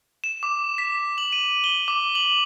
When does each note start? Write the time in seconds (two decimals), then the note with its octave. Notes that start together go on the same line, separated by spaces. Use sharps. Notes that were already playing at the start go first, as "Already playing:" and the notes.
0.24 E7
0.43 D6
0.78 B6
1.18 F#7
1.32 D#7
1.64 G7
1.88 D6
2.15 F#7